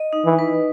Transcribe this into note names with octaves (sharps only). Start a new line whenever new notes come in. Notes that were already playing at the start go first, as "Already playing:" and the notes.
Already playing: D#5
D#4
E3
B4